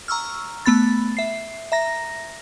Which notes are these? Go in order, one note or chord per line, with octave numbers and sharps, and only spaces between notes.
A#5 C#6 E6 F6
A3 B3 B5 A6
E5 C7
E5 A#5 A#6